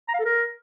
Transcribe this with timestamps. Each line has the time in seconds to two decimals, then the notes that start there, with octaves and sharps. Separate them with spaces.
0.09 A#5
0.14 F5
0.20 A4
0.25 A#4